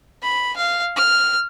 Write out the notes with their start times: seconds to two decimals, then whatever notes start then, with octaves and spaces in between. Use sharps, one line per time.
0.23 B5
0.57 F5
0.97 F6